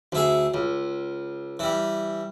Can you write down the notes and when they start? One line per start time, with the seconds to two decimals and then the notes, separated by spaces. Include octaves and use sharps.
0.12 D2 E4 G#4
0.54 C#2
1.59 E3 G3